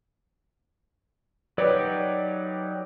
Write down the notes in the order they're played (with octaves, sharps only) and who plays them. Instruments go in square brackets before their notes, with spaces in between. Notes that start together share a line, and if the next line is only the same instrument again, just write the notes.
[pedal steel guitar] F#3 D#4 G4 [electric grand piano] B4 C#5 D5